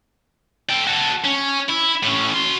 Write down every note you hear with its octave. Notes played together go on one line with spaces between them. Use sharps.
A4 G5
F#4 A4
C#4
E4
A2 C#4
F#4 C6